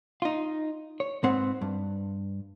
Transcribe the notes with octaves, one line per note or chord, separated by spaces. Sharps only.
D#4 F4
C#5
G#2 C4 B4 F#5
G2